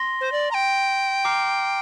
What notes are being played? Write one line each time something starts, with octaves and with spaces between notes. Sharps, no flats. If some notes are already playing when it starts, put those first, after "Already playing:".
Already playing: C6 A#6 G7
C5
D5
A#5
G5
A#5 D6 F6 C7